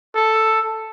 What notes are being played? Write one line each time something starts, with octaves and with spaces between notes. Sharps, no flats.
A4